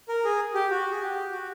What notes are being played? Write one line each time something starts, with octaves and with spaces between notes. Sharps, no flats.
A#4
G#4
G4
F#4
G#4
G4
F#4